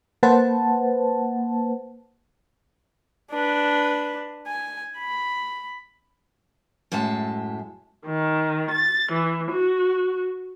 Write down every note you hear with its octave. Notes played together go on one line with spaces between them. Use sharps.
A#3 B4 C5 F#5 A5
D4 B4
G#5
B5
F#2 A2 G#3 E5 A5
D#3
A6
E3
F#4